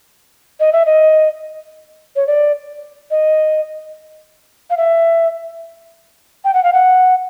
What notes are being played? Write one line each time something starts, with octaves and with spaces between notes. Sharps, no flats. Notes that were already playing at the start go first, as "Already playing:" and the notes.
D#5
E5
D#5
C#5
D5
D#5
F5
E5
G5
F#5
F5
F#5